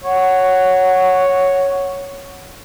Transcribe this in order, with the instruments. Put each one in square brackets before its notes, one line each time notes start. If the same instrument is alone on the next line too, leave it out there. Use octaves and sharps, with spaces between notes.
[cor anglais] C#5 [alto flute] F#5